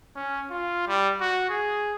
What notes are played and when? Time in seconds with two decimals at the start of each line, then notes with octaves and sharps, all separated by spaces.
0.15 C#4
0.51 F4
0.87 G3
1.20 F#4
1.49 G#4